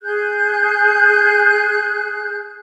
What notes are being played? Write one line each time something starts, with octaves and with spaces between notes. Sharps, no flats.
G#4 F#6 G6